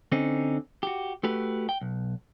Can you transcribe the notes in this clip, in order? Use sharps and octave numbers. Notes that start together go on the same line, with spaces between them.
D3 C4 C#4 D#4
F#4 G4
A3 F#4 G4 B4
G5
B1